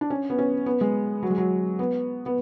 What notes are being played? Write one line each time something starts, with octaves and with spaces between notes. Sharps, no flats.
D4
C#4
B3
C#4
B3
G#3
F#3
G#3
F#3
B3
B3